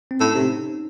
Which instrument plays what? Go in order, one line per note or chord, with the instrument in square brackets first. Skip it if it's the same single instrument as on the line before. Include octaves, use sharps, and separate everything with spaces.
[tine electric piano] C4
[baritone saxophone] A2 [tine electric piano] C#4
[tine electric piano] D#4
[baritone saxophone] C3